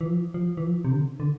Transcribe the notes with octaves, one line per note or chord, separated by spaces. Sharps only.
E3
F3
F3
E3
F3
C3
D3
D3